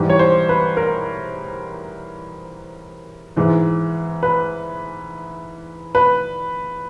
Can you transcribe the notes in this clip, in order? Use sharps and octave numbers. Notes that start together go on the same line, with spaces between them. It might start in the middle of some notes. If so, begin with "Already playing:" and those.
Already playing: G#2 E3 G3
C#5
C5
B4
A#4
G#2 E3 G#3
B4
B4